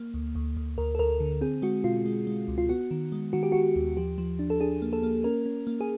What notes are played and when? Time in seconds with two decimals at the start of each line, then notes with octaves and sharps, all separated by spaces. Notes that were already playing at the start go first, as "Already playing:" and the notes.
Already playing: A#3
0.14 D2
0.35 D2
0.57 D2
0.78 D2 A#4
0.95 A4
0.99 D2 A#4
1.20 D3
1.41 C4 G#4
1.62 G#3 F#4
1.84 B2 F4
2.06 G#3
2.27 G#3
2.48 C#2
2.58 F4
2.69 B3 F#4
2.91 D#3
3.12 G#3
3.33 D#3 F#4
3.43 G4
3.52 D#3 F#4
3.76 D#2
3.97 F3 G4
4.18 F3
4.39 D4
4.50 A4
4.60 D4 G#4
4.82 A#3
4.93 A4
5.03 A#3
5.24 C#4 A#4
5.46 C#4
5.67 A#3
5.81 G#4